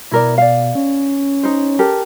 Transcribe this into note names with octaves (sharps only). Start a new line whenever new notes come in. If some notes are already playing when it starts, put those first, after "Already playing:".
B2 E4 A#4 D5
D5 F5
C#4
D#4 C5
G4 A4 A#4